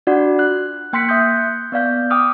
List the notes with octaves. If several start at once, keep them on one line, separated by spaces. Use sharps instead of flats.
D4 F4 F#4 D5 F#5
F#6
A#3 G5 C6 F#6 B6 C#7
E5 D#6 G6
B3 D5 F5 G6
G5 D6 D#6 F6